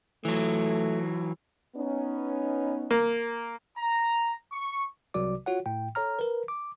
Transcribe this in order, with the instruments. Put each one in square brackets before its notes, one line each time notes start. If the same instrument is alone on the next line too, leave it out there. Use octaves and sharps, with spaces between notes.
[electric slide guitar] E3 F#3 [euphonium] A3
[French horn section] B3 C#4 D#4
[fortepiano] A#3
[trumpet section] A#5
C#6
[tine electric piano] C2 C3 F#3 F#4 D5 D6
F4 F#4 C#5 F#5
A2 G5
A4 C#5 A#5 F6
A#4 B4
D6